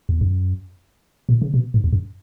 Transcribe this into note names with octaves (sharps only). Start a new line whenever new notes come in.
E2
F#2
A#2
C#3
B2
G#2
E2
F#2